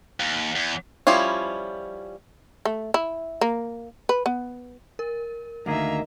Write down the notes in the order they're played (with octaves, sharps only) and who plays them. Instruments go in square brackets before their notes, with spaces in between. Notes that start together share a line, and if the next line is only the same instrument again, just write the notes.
[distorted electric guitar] D#2
E2
[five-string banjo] F3 G3 C#4 E4 F4
[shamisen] A3
E4
A#3
B4
B3
[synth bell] A#4
[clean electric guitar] D2 A#3 G#4 [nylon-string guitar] D#3 D#5 [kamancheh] E5 A#5